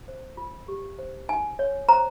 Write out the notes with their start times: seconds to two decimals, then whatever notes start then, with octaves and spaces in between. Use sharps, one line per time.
0.08 C5
0.37 F4
0.68 G4
0.99 C5
1.29 D#4 G#5
1.59 C#5
1.89 C5 A#5